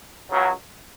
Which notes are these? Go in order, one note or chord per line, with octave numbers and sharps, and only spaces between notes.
C#2 C#3 F#3